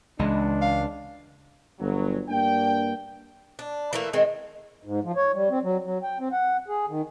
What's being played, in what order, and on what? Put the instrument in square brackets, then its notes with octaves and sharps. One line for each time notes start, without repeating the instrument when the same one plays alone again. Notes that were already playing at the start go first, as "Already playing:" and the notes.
[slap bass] C#2 [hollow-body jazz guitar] E3 G#3 D#5 [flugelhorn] D4
[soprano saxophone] F5
[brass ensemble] G1 F#3
G2 A#3 D4 G5
[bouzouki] D4
E3 A3 A#3
D#3 G#3 C4
[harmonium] G#2
F3
C#5
G3
C4
F#3
F#3
G5
C4
F#5
G#4
D#3